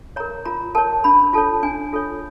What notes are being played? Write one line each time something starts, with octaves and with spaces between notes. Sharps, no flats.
A#4 C#5 A#5
F4 A#5
A#4 C#5 A5
D4 B5
F4 A4 C#5 A5
D4 G#5
F4 A4 C#5